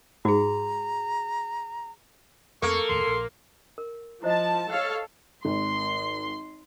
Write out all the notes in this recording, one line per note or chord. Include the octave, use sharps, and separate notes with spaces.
G#2 F#4 G#4 A#5
F2 A3 A#3 C4 A4 C#6
F1 D#2 A2 C6
A#1
A#4
F3 E4 C5 D#5 A5
A4 C#5 F5
G#1 C6